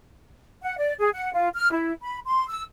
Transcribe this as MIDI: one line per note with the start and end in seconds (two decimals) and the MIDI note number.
0.63 0.76 78
0.78 0.93 74
0.99 1.10 68
1.14 1.31 78
1.34 1.48 65
1.55 1.71 89
1.71 1.92 64
2.03 2.19 83
2.26 2.45 84
2.50 2.63 88